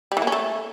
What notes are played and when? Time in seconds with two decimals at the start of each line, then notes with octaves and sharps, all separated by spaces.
0.12 G3
0.17 E3
0.22 A#3
0.27 C#4
0.32 A3